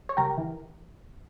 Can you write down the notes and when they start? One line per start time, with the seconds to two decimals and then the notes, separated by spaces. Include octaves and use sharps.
0.09 C#5
0.17 C#2 G4 A#4
0.37 E3